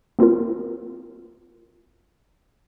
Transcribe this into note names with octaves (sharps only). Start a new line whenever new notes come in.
A#3 C4 E4 F4 A#4